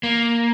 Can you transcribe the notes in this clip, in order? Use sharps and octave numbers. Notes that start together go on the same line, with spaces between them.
A#3